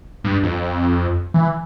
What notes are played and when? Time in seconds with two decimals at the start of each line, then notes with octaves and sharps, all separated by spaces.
0.24 G2
0.43 F2
1.34 E3